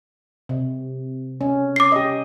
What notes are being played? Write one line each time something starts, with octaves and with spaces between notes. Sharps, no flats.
C3
C#4
D6 C7
G4 D#5